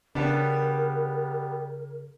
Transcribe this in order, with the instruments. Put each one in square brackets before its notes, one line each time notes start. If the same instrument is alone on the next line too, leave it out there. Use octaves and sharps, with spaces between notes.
[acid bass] C#3 [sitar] G3 B3 [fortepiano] D4 [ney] A#4